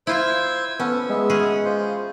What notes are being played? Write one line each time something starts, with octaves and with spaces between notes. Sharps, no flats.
E4 F4 C5 E5 E6 G#6
B3 C#4 A4 B4
G#3 B3 E5
C#4 F#4 G#4
F4 C5